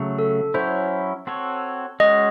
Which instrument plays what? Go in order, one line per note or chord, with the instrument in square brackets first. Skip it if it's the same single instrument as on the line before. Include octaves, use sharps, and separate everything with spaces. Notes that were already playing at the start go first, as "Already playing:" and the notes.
Already playing: [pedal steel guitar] C#3 F#3 A3
[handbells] A4
[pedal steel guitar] F#3 C#4 E4 [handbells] C5
[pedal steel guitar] C4 F#4 A4 C#5
[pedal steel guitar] G#3 C#4 F#4 [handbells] D#5